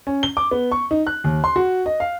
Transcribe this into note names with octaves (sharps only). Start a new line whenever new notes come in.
C#4
G7
D6
B3
C#6
D#4
F#6
D#2
C6
F#4
D#5
F5